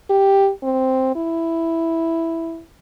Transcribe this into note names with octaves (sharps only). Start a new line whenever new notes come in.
G4
C4
E4